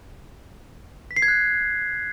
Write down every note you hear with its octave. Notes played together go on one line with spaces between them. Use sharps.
B6
C7
G#6
F#6